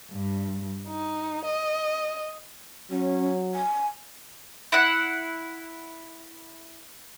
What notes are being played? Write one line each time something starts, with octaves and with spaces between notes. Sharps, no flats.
G2
D#4
D#5
F#3 C#4
G#5
E4 F#5